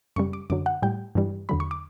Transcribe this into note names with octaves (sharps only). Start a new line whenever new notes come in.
F#2 C#3 G3 C#6
D6
F#2 D3 F#3 D6
F#5
A2 G3 G5
G2 E3 G3
E2 D3 F#3 B5
C#6
D6